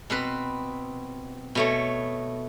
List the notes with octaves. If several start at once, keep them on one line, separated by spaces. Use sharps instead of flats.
B2 C4 B4
B2 A3 C#5